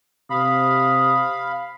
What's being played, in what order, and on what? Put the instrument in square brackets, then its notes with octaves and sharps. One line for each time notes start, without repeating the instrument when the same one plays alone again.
[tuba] C3 [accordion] F5 B5 [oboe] D#6